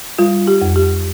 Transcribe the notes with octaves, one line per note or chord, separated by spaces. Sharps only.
G3 F4
G4
F2
G4